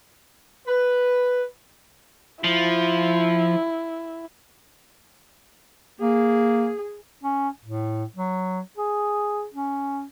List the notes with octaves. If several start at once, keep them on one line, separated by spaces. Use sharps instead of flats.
B4
F3 E4
A#3 G#4
C#4
A2
F#3
G#4
C#4